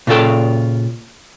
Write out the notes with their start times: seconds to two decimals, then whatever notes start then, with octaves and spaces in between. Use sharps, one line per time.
0.07 A#2 C#3 F4 A4 G5